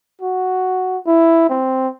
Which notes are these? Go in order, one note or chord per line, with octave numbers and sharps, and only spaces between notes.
F#4
E4
C4